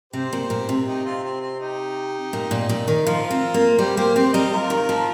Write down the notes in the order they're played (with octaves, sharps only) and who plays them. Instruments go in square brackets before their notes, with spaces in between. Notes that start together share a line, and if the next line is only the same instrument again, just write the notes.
[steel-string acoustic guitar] C3 [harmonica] G4 C5
[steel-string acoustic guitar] A#2
A#2
C3
[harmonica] D#4 G4
C4 F4
C4
C4
D#4 G4
[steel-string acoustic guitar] A#2
A#2
A#2
D#3
[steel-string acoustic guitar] F3 [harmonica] F4 A#4
[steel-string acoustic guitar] C4
A#3
[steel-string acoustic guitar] G3 [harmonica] G4 C5
[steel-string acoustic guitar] A#3 [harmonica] G4 C5
[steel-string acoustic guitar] C4 [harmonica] G4 C5
[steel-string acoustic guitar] G3 [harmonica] A#4 D#5
[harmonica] F4 A#4
[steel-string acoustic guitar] D#3
F3